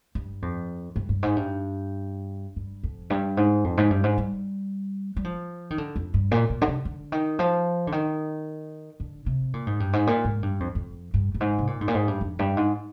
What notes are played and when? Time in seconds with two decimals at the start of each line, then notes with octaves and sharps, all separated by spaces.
0.15 G2
0.42 F2
0.96 G2
1.09 G2
1.23 G#2
1.36 G2
2.56 G2
2.83 F2
3.10 G2
3.37 G#2
3.64 F2
3.78 G#2
3.91 G2
4.04 G#2
4.18 G3
5.17 G3
5.24 F3
5.70 D#3
5.78 D3
5.96 F2
6.14 G2
6.31 A#2
6.50 A#2
6.62 D3
6.67 C3
6.85 D3
7.12 D#3
7.39 F3
7.87 D3
7.92 D#3
9.00 D3
9.26 C3
9.54 A#2
9.67 G#2
9.80 G2
9.93 G#2
10.07 A#2
10.25 G#2
10.43 G2
10.60 F2
10.75 F2
11.14 G2
11.34 G2
11.40 G#2
11.59 C3
11.67 A#2
11.81 G#2
11.88 A#2
11.94 G#2
12.08 G2
12.21 F2
12.39 G2
12.57 G#2